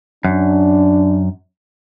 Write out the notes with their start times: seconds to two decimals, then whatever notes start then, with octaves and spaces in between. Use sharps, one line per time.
0.25 F#2 D4